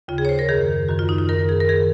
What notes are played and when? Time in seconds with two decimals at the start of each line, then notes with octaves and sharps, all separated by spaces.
0.08 D#2 C#3 F4
0.18 G#4
0.25 C#5
0.29 C5
0.39 A#4
0.49 F#2 D#3 G#4
0.88 F#2 D#3 F#4
0.99 F4
1.09 D#4
1.18 F4
1.29 F#2 D#3 A#4
1.49 G#4
1.60 A#4
1.69 D#3 G#4